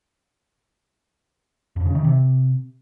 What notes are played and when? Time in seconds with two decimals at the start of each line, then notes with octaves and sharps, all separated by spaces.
1.76 F2
1.86 C#3
1.95 D#3
2.04 C3